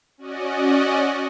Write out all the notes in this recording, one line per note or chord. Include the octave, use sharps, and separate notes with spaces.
C#4 F#4 D5 D#5